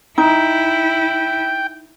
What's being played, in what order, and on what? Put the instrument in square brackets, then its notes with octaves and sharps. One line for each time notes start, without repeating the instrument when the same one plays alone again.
[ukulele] D#4 [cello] E4 [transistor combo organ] G5